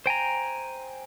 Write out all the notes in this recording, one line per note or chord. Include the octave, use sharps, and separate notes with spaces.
C5 G5 G#5 A#5